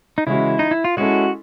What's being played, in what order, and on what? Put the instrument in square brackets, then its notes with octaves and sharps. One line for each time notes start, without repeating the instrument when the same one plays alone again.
[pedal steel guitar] D#4
[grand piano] C#3 E3 G#3 C#4 F#4 [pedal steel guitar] E4
[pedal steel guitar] D#4
E4
F4
[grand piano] G#3 C#4 E4 A4 [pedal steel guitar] F#4